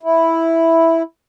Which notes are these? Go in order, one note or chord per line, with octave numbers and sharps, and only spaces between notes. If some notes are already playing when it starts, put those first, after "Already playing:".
E4